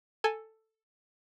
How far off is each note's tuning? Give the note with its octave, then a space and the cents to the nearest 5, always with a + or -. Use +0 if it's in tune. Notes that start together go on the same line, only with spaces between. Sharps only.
A4 +5 G#5 +0